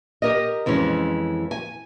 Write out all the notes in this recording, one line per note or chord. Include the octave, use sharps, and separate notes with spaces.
G4 A#4 D#5
F2 E3 G#3 C#4
G#5